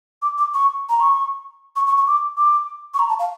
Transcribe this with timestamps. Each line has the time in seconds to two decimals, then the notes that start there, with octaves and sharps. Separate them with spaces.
0.22 D6
0.38 D6
0.54 C#6
0.89 A#5
1.00 C#6
1.76 C#6
1.87 C#6
1.97 C#6
2.07 D6
2.37 D6
2.94 C#6
2.99 A#5
3.09 A5
3.19 F5